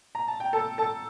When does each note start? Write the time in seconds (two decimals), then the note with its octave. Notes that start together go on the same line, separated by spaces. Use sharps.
0.15 A#5
0.28 A5
0.40 G5
0.53 A4 A5
0.78 A4 A5